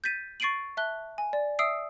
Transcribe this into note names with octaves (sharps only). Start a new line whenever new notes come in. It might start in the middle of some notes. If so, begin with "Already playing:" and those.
G6 A6 B6 D#7
C#6 A6 C7 D7 D#7 F#7
E5 A5 F#6 G7
G#5
D5
E5 D#6 E6 C7 D7